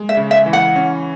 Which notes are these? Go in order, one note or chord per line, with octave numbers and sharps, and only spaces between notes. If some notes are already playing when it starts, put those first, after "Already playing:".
Already playing: G#3
E5
C#3
E5
E3
F#5
C#4